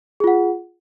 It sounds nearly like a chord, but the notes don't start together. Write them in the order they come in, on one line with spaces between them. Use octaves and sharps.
G#4 F4 F#5